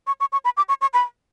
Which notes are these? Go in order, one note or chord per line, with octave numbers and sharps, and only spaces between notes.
C#6
C#6
C#6
B5
D6
C#6
C#6
B5